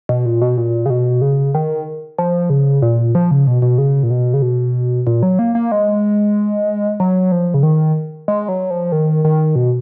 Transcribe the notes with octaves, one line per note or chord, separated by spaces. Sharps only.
B2
A#2
B2
A#2
C#3
B2
C#3
D#3
F3
C#3
A#2
F3
C#3
B2
B2
C#3
A#2
B2
C#3
B2
A#2
F#3
A#3
A#3
G#3
F#3
F3
C#3
D#3
G#3
F#3
F3
D#3
D#3
B2